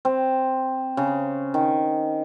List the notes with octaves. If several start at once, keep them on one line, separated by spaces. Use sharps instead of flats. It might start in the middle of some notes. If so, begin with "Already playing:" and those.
C4
C#3
D#3